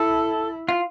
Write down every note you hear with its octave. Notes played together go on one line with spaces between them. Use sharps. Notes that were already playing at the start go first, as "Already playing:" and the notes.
Already playing: E4 A4
F4